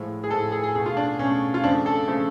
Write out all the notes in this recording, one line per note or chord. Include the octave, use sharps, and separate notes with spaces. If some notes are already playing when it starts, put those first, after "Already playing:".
Already playing: A2 F3 G#3
G#4
A2 F3 G#3 A4
G#4
G#4
B2 A3 G#4
F4
D4
B2 A3 C#4
F4
F2 C#3 F3 A3 D4
A4
C#3 F3 A3